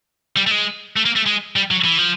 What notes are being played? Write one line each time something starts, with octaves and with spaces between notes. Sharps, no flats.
G3
A3
G#3
A3
A#3
A3
G#3
G3
F#3
E3
F3